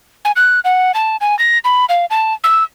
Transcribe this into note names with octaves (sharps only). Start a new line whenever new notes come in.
G#5
F#6
F#5
A5
G#5
A#6
B5
F5
A5
E6